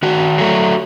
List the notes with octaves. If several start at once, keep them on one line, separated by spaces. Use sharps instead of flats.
D#3 F#4
F#3 A3